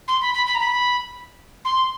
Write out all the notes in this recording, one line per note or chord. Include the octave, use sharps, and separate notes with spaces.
C6
B5
B5
B5
A#5
B5
C6